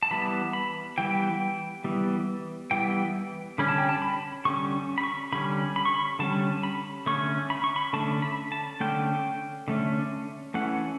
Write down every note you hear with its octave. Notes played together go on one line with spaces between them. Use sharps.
A5
E3 G3 B3 B5
B5
E3 G3 B3 G5
E3 G3 B3
E3 G3 B3 G5
D3 G3 C#4 B5
A5
G5
A5
B5
D3 G3 C#4 C#6
B5
C#6
D3 G3 C#4 B5
B5
C#6
B5
D3 G3 C#4 A5
B5
D3 A3 C#4 C#6
B5
C#6
B5
D3 A3 C#4 A5
B5
A5
D3 A3 C#4 G5
D3 A3 C#4
E3 A3 C#4 F#5